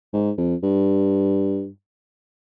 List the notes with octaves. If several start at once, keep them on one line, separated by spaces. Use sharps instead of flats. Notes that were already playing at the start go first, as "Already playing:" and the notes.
G#2
F2
G2